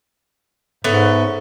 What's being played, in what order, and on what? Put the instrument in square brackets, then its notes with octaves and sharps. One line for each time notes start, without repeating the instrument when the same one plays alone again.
[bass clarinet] G#2 [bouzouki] A3 B3 C#4